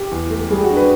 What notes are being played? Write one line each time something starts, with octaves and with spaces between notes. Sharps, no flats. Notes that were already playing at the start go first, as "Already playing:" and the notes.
Already playing: G4
E2
A3
G3 G#4
F#4
D4
B4